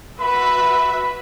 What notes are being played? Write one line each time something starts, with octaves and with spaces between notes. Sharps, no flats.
F#4 B4 E5 B5